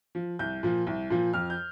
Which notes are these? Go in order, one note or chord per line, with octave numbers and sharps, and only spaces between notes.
F3
C2 G6
A#2 F3
C2
A#2 F3
F2 F6
G6